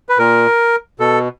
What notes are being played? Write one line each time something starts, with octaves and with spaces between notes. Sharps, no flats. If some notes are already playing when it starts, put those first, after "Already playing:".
B4
A#2 A#4
B2 A4